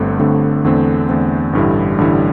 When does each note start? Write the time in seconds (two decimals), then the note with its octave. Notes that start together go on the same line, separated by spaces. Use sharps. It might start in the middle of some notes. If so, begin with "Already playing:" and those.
Already playing: G1 G2 D3 A3 C4
0.19 G1 G2 D3 A3 C4
0.64 E2 D3 A3 C4
1.09 E2 D3 A3 C4
1.53 A1 G2 D3 G3 E4
1.98 A1 G2 D3 G3 E4